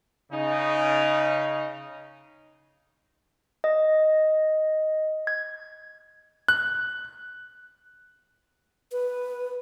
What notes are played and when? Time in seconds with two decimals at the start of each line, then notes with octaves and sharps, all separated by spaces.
0.31 C#3 D#4
3.64 D#5
5.27 G#6
6.48 F#6
8.92 B4